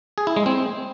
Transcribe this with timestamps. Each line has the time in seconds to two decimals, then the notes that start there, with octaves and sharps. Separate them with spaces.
0.18 G#4
0.27 E4
0.36 G#3
0.46 C4